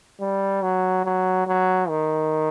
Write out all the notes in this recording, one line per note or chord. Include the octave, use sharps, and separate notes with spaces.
G3
F#3
F#3
F#3
D#3